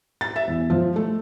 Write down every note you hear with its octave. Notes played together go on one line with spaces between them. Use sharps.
A6
E5
E2
F3
A3